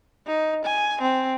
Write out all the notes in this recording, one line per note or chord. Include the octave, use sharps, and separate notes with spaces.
D#4
G#5
C4